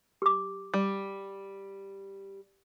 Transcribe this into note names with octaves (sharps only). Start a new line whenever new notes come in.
G4 D6
G3